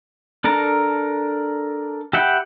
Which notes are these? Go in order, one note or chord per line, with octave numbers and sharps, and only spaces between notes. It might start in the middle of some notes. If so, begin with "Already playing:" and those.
D4 A4 A#4 A#5
G4 E5 F#5 G5 B5